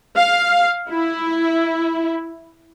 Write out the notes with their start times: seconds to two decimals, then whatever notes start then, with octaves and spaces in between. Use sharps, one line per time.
0.16 F5
0.90 E4